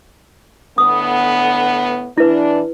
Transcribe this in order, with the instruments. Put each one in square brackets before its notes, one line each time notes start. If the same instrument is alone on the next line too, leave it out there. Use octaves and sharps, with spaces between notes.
[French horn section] A2 D3 B3 [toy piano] D#6
[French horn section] E3 D4 [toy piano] E4 B4